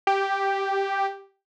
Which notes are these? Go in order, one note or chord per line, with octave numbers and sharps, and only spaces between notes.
G4